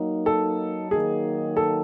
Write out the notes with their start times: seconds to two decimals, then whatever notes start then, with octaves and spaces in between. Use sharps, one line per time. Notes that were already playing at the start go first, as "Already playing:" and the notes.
Already playing: F#3 A#3 D#4
0.26 A4
0.91 D#3 F#3 A#3 D#4 G#4
1.57 A4